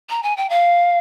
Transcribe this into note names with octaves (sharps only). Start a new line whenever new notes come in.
A#5
G#5
G5
F5